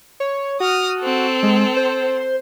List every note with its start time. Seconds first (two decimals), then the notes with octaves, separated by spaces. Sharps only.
0.20 C#5
0.60 F#4 D#6 F6
1.00 C4 A4
1.43 G#3
1.76 C5